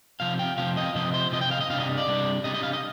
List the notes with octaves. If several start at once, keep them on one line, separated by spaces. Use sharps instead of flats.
C3 F3 C4 F5
G5
C3 F3 C4 F5
D#5
C3 F3 C4 D#5
C5
C3 F3 C4 D#5
G5
F5
D#5
C3 G3 D4 F5
D#5
D5
C3 G3 D4
C3 G3 D4 D#5
D#5
F5
D#5